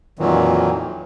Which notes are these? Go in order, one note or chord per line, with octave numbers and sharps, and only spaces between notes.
F2 A#2 D#3 E3 F#3